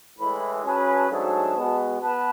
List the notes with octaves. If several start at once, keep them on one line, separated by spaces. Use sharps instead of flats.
A2 E3 G#3 B5
G#5
F#3 C#4 G#4 B4 A5
B5
A5
G#5
G#2 F#3 A3 D4 G#4 A5
B2 G#3 B3
B3 B4 A5